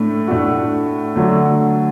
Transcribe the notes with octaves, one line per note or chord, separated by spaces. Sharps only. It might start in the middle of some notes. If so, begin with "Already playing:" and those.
Already playing: A2 A3 D4
A2 A3 D4 F#4
D3 F#3 A3